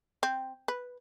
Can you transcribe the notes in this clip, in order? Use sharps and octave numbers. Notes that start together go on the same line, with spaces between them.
C4
B4